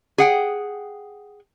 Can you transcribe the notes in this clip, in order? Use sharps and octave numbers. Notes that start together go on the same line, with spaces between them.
G#4 F#5 G5